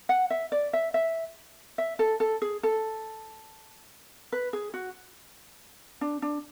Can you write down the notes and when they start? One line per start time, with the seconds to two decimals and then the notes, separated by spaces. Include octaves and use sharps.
0.09 F#5
0.30 E5
0.52 D5
0.73 E5
0.94 E5
1.78 E5
1.99 A4
2.20 A4
2.42 G#4
2.63 A4
4.32 B4
4.53 G#4
4.74 F#4
6.01 D4
6.22 D4